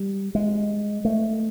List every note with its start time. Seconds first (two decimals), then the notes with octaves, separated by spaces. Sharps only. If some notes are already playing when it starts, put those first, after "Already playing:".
Already playing: G3
0.35 G#3
1.05 A3